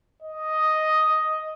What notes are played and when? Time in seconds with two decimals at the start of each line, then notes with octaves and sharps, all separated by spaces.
0.23 D#5